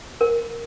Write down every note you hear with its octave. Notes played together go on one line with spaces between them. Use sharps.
A#4